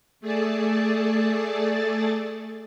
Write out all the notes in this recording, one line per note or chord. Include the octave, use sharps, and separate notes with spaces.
A3 G#4 A4 D5 A5